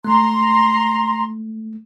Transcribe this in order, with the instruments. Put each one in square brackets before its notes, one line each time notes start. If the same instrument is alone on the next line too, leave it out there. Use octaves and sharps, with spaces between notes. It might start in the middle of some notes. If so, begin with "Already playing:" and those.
[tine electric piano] A3 [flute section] A#5 C6